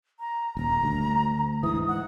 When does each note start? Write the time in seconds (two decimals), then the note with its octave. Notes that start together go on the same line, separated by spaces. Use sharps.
0.20 A#5
0.57 D#1 A#5
0.83 D2
1.63 G#2 E3 D#6
1.88 F#5